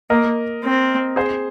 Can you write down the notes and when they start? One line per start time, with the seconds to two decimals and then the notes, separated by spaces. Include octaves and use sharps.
0.10 A#3 A#4 D#5
0.63 C4
1.16 G#4 C5